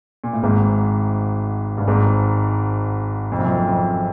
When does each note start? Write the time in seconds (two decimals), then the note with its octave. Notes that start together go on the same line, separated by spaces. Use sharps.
0.24 A#2
0.33 A2
0.43 G#1 G#2
1.78 G2
1.87 G#1 G#2
3.32 F2
3.39 F#2
3.45 F2
3.68 F2